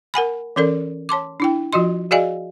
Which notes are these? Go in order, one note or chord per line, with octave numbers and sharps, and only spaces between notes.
A#4 F#5 G#5 B5
E3 C#4 A4 A#4 D5
C#5 A5 C6 D6
D4 E4 G5
F3 F4 F#4 D#5 C6
F#4 G#4 D5 D#5 F5 G#5